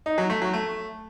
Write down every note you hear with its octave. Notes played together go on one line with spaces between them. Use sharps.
D#4
F#3
A3
F#3
A3